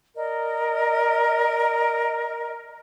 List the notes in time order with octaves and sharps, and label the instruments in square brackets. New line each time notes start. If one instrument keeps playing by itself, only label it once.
[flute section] A#4 D5 D#5